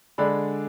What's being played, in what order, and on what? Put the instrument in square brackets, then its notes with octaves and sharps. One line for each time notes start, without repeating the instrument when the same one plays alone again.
[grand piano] D3 G#3 D4 B5